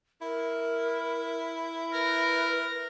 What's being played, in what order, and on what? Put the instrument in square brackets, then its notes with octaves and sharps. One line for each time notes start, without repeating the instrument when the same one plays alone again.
[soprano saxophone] E4 [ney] A#4
[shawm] A#4 [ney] B4